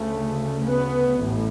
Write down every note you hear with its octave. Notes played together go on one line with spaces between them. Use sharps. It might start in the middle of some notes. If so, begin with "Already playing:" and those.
Already playing: D2 C#3 A3
B3
A1 A2